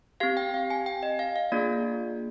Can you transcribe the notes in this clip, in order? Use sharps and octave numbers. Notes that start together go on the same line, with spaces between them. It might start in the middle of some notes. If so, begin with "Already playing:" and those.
C4 G4 F5
G5
F5
G#5
G5
D#5
F5
F5
A#3 D4 F4 G#4 D5